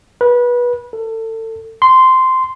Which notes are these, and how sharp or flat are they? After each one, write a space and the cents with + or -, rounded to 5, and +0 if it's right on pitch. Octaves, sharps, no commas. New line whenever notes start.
B4 -25
A4 +30
C6 -10